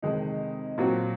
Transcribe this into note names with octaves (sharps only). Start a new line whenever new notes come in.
F2 C3 D#3 G#3 D#4
A#2 F#3 C4 F#4